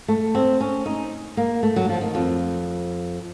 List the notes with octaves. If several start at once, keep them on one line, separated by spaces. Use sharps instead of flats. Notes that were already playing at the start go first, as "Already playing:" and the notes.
A3
C4
C#4
D#4
A#3
A3
F#3
F3
D#3
F2